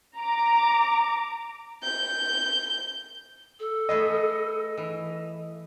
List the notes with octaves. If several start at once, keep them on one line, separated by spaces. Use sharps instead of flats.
A#5 D6
G6
A4
A3 B3 G#4 D#5
E3